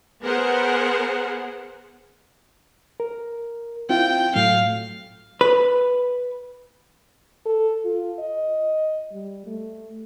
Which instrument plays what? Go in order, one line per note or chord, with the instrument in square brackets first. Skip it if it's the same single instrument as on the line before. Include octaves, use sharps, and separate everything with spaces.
[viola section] B3 G#4 A#4 C5 F#5
[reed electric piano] A#4
[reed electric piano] C4 E4 F4 [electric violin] G5
[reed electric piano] A2 F#3 A3 [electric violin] F5
[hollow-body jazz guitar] B4
[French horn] A4
F4
D#5
G3
A3